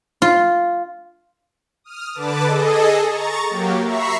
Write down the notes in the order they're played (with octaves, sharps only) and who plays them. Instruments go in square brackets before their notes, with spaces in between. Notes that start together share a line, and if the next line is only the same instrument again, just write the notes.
[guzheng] F4
[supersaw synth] D#6 F6
D3 B4 A5 D6
G#4 A4 D#5
A#5 C#6 A6
F#3 A#3 G4
E5 A#5 B5 C#6 C7